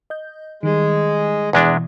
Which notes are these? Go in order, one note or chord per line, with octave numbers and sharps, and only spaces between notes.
D#5 G6
D#3 G3 G#3
E2 B2 E3 G#3 D4